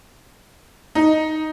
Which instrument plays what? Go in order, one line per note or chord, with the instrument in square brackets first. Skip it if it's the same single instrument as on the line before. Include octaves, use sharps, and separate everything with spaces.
[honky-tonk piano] D#4